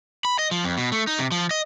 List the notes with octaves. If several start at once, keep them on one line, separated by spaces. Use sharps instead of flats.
B5
D#5
F3
F2
B2
A3
D#4
C3
F3
D#5